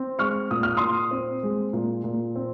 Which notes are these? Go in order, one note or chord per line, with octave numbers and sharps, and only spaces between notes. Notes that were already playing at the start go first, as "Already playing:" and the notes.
Already playing: C4
G#3 C#6 F6
A#2 D#6
F6
A#2 C6 D#6
C4
G#3
A#2
A#2
C4